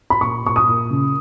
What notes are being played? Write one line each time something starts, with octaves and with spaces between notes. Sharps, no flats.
B5
A#2 C#6
A#2 C#6
D#6
A#2
C#3